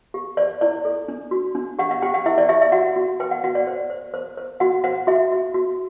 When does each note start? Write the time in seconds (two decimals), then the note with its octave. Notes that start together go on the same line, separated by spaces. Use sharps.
0.14 G4
0.37 C5 D5
0.61 E4 D5
0.85 A4
1.08 D4
1.31 F#4
1.55 D4
1.79 G4 F#5
1.91 F#5
2.02 G4 G5
2.14 F#5
2.26 E4 E5
2.38 D5
2.49 G4 E5
2.62 E5
2.72 F#4 F#5
2.96 F#4
3.20 B4 G5
3.31 F#5
3.44 F#4 F#5
3.55 D5
3.67 C5
3.90 C5
4.14 C5
4.37 C5
4.60 F#4 F#5
4.84 C5 F#5
5.07 F#4 E5
5.32 F#4
5.54 F#4